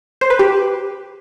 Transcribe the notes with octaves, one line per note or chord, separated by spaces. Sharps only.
C5
B4
G4